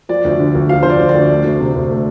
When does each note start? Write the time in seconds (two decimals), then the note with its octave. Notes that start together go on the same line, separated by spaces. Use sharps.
0.09 F3 D5
0.25 D2
0.39 D3
0.55 D2
0.69 F3 F5
0.83 D2 C5
0.90 D5
0.99 D3
1.09 D5
1.14 D2
1.29 A3
1.44 D2
1.60 C3
1.75 D2
1.90 A3